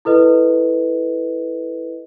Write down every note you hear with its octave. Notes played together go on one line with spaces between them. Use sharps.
E4 A4 B4 D#5